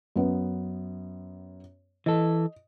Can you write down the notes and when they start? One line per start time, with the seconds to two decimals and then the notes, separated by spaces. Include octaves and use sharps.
0.16 F#2 B3
2.06 E3 A4 D#5